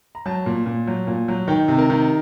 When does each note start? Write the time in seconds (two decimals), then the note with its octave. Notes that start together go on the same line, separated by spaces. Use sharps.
0.15 A#5
0.26 F#3 A5
0.46 A#2
0.66 A#2
0.87 F#3
1.07 A#2
1.28 F#3
1.48 D#3 G5
1.68 C3
1.78 A#4
1.90 D#3